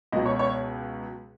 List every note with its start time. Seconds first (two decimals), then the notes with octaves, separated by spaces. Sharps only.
0.12 C#2 B2 F#3 D#5
0.26 C#5
0.39 C#5